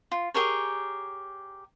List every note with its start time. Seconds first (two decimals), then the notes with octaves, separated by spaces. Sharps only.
0.11 F4
0.34 G4 G#4 A#4 C#5